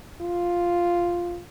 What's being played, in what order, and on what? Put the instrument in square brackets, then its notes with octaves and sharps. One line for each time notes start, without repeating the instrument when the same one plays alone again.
[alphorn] F4